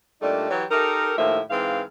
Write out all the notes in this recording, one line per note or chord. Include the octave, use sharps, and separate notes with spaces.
A#2 G3 A3 D4 D#4
E3 F#3 G4 C#5
D#4 G4 A4 A#4
D#2 A2 F3 A#3 E5
G#2 E3 C4 F5